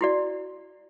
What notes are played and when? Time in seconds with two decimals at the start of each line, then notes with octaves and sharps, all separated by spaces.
0.01 E4 F#4 D5